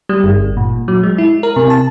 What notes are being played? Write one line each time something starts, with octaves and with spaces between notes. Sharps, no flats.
G3
G1
A#2
F#3
G#3
E4
A#4
C3
A5